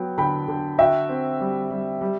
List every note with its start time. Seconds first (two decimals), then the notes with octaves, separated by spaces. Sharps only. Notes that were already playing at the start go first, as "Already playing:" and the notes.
Already playing: F#3 B3 G5
0.18 D3 G5 B5
0.48 D3
0.79 F#4 E5 G5
1.09 C4
1.40 G3
1.71 G3
2.01 G3